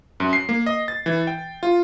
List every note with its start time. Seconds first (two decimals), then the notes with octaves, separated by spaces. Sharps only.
0.20 F#2
0.33 C7
0.49 A#3
0.66 D#5
0.88 A6
1.06 E3
1.27 G5
1.63 F4